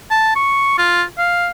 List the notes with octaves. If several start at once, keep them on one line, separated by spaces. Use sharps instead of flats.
A5
C#6
F4
F5